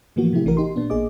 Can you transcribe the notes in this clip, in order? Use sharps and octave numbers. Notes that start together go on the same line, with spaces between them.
A2 E3 F3 A#3 B3 F#4
C3 A3 E4 G4
A1 E3 B3 E4 F#4 A#4
D#4 G4 C6
A#2 B3 D4
A1 A#3 G#4 D#5 D6